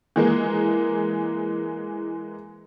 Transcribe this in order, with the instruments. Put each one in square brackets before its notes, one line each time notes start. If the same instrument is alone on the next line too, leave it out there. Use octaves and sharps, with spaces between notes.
[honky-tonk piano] E3 G#3 A#3